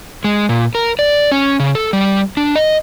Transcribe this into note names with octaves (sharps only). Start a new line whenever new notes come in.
G#3
A#2
A#4
D5
C#4
C#3
A4
G3
D4
D#5